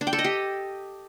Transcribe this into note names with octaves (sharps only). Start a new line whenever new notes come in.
D4
G5
A4
D#5
G4